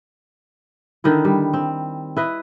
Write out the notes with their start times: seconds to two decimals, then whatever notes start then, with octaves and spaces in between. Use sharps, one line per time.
1.04 D3 D#3 D#4 E4
1.25 G3
1.53 C4
2.16 E4 B4 D#5